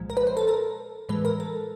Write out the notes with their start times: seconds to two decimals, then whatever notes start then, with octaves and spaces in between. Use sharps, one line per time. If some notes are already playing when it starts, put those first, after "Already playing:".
Already playing: C2 A#2 F3 G#3
0.10 A#4
0.17 B4
0.27 C5
0.37 A4
0.48 A#4
1.09 A2 E3 G#3 B4
1.25 A#4
1.40 A4